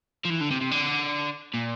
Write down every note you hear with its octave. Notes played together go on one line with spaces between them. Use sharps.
F3
E3
D3
C3
C3
D3
A#2